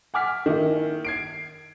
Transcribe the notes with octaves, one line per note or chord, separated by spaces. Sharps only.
F#5 G#5 D6 F6 B6
D#3 A#3 E4
G#6 C7 D7